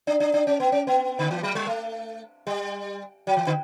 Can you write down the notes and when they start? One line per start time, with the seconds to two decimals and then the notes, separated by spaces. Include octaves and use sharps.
0.07 D4
0.20 D4
0.34 D4
0.47 C#4
0.60 B3
0.72 C#4
0.87 B3
1.19 D3
1.31 E3
1.43 F#3
1.55 G3
1.67 A3
2.47 G3
3.27 F#3
3.37 E3
3.47 D3